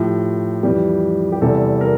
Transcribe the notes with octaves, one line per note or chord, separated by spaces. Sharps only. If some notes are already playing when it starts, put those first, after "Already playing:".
Already playing: A2 F3 G4
F2 E3 G3
G4
E2 C3 E3 G3 A4
A#4